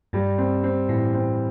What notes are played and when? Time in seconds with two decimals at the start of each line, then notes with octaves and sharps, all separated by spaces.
0.13 G2 G3
0.38 C4
0.64 C4
0.89 A2 E3
1.14 C4